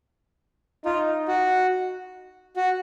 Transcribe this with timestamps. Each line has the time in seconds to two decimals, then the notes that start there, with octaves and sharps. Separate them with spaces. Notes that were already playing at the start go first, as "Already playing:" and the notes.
0.84 D#4 F4
1.28 F#4
2.57 F#4